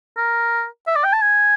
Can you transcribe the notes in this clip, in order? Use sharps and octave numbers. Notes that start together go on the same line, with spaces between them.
A#4
E5
D5
G5
A5
G#5